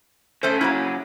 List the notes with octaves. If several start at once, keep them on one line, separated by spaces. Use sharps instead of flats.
C#3 A3 A4 C5
F#3 A#3 E4